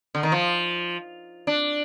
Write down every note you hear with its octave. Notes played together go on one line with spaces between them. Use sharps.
D3
D#3
F3
D4